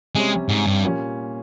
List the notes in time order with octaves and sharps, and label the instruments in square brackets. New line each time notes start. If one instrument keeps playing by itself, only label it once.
[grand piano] C3 G3 C#4 [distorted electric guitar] G#3
[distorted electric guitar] G#2
G2
[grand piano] A#2 G3 C#4